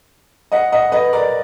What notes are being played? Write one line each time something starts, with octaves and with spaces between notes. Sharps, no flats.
D#5 F#5
D#5 F#5
B4 D#5
A#4 D5